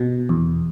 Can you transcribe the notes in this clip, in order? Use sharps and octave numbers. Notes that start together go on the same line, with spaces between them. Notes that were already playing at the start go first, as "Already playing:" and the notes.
Already playing: B2
E2